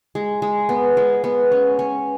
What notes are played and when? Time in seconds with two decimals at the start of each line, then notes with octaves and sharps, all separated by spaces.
0.15 G#3
0.42 G#3
0.69 B3
0.97 G#3
1.24 B3
1.52 C#4
1.79 C#4